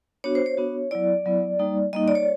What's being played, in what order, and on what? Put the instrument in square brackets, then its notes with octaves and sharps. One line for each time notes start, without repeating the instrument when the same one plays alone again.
[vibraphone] B3 D4 F#4 C#5
C5
C#5
B3 D4 F#4
F#3 B3 E4 D5
F#3 B3 E4
G3 A#3 D#4
G3 A#3 D#4 D#5
D5
C#5